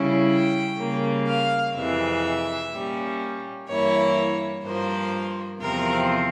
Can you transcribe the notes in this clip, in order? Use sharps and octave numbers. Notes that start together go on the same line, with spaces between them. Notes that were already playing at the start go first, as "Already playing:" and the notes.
Already playing: C#3 G3 C#4 E4
G5
C#3 G3 A#3
F5
F2 C3 E3 G#3 E5
A#2 G3 C#4
G2 E3 A#3 E4 C#5
G2 F3 A#3 C5
E2 C3 F3 C4 A#4